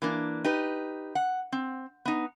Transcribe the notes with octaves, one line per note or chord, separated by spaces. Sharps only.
E3 A#3 D4
D#4 G4 B4
F#5
C4
B3 D#4